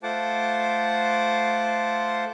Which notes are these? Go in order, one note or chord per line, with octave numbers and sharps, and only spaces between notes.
A3 F4 C5 F#5 A5 D6